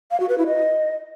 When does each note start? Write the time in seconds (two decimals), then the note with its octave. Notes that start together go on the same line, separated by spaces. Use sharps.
0.11 F5
0.20 F#4
0.29 B4
0.38 E4
0.47 D#5